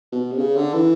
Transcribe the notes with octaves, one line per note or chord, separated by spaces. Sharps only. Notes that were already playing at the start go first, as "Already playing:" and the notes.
B2
C3
C#3
D3
E3